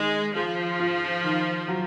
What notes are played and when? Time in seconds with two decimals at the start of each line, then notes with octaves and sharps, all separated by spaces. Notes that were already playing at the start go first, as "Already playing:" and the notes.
Already playing: D#3 G#3
0.35 F3 G#4
0.80 F4
1.24 D#3
1.68 F#3